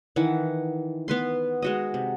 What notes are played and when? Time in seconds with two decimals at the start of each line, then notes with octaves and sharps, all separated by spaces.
0.16 D#3 E3 F#5
1.08 B3 B4 C6
1.62 G#3 F#4 D#5
1.94 C3